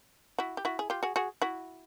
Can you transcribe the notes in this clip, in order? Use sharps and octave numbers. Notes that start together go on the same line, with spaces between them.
E4 F#4
G4
E4 F#4
G#4
F4 G4
F#4 G#4
F#4 G#4
E4 F#4